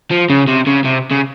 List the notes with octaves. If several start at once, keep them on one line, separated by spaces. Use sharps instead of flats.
F3
C#3
C3
C#3
C3
C#3